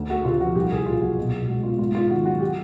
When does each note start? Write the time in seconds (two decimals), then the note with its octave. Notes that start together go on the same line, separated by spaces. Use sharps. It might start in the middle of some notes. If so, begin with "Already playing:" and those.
Already playing: D2
0.09 A3 F#4
0.25 C3 F4
0.40 F3 F#4
0.55 C2 G4
0.71 C2 G#4
0.86 A#2 F4
1.02 F#3 F#4
1.17 B2
1.33 B2
1.48 G#3 F#4
1.63 B3 F4
1.79 G#2 F4
1.94 A#3 F4
2.10 D#3 F#4
2.25 F#3 F#4
2.40 G4